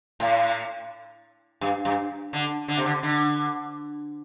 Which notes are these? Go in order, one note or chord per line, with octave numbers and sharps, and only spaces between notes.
A2
G2
G2
D3
D3
C3
D3
D3